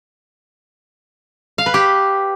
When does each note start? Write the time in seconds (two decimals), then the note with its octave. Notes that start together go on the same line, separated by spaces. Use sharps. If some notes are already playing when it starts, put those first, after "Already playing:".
1.58 F5
1.66 B4
1.74 G4